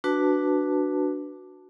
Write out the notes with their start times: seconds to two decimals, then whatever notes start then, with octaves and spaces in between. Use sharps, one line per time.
0.04 D4 F#4 B4 A5